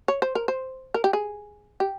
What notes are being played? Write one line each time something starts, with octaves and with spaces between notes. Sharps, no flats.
C#5
C5
A#4
C5
A#4
G4
G#4
G4